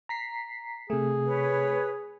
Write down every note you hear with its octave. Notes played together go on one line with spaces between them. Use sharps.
A#5 B6 C7
C3 A3 G#4
B4 C#5